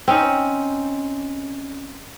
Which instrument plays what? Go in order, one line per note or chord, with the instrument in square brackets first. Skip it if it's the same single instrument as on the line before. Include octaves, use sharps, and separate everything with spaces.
[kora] C4 C#4 D#4